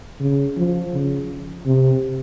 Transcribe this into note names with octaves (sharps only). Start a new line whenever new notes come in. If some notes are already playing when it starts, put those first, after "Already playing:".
C#3
F3
C#3
C3